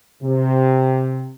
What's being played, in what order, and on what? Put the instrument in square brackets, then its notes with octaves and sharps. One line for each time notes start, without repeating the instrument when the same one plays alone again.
[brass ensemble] C3